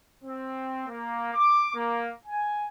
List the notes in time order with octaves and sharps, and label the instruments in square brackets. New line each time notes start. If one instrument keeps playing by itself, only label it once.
[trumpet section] C4
A#3
D6
A#3
G#5